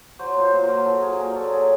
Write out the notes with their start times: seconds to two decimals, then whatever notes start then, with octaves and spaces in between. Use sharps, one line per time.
0.19 F#3 C5
0.36 A#2 C5
0.52 A#2
0.63 A#4
0.69 F#3
0.85 F#3 A4
1.02 A#2 G#4
1.19 A#2 A#4
1.36 F#3 A4
1.52 F#3 G#4